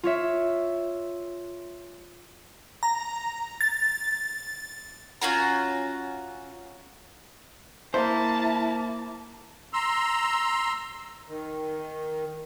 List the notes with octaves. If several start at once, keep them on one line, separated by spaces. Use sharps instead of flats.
F4 C#5 E5
A#5
A6
C#4 F4 F#4 A#5
A#3 E4 C5 A5
A#5 C6 E6
D#3